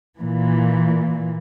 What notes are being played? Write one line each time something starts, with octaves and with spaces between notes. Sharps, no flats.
A#2 E3